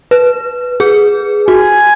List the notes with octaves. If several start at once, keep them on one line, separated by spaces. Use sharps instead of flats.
B4
G#4
F#4 G#5